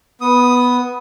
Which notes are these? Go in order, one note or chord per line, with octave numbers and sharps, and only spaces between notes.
B3 D#6